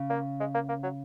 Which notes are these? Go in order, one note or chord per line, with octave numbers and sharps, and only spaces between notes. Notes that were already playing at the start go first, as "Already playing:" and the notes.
Already playing: C#3
A#3
G#3
A#3
A#3
F#3